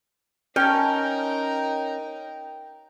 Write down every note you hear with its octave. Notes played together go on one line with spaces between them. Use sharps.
C#4 D#4 A#4 G5 A5 F6